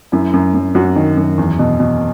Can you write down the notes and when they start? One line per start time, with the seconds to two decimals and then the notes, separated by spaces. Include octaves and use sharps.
0.12 F#2 E4
0.33 F#2
0.54 F#2
0.75 F#2 F#4
0.96 D#3
1.17 F#2
1.38 E2
1.59 B2
1.80 B2